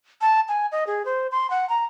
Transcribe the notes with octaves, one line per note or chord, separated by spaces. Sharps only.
A5
G#5
D#5
G#4
C5
C6
F#5
A#5